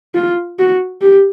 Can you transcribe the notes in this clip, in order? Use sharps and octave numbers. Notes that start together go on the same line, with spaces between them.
F4
F#4
G4